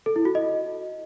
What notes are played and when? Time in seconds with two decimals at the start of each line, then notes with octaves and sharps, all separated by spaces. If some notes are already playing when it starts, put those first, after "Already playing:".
0.06 A4
0.16 E4
0.25 F#4
0.35 D#5